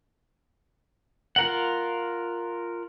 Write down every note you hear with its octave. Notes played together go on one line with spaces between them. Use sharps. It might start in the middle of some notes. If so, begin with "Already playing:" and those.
F4 A#4 F#5